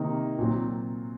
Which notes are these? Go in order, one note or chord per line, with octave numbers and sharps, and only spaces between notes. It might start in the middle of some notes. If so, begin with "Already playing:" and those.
Already playing: C3 D#3 A#3 D#4
A#2 F#3 C4